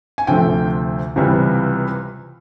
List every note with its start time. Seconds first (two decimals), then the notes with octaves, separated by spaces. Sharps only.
0.18 G#5
0.27 D2 C3 F3 A3 C4 G5
1.16 C#2 C3 E3 G3